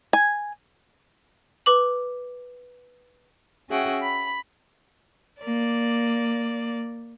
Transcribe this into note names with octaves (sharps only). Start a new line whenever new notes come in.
G#5
B4 D6 F#7
C#4 F#4 G#4 E5 F#5 G5
B5
A#3 D5